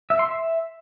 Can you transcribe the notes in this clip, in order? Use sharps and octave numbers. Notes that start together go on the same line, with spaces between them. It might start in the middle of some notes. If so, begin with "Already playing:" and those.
E5
C6
E5